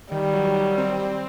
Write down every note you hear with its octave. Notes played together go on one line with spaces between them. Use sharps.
D#3 G3
F#3
D#3
C4
C4